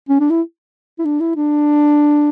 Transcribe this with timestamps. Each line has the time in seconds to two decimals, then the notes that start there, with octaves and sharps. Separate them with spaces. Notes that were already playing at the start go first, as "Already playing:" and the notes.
0.09 C#4
0.20 D4
0.30 E4
0.99 E4
1.05 D4
1.20 E4
1.36 D4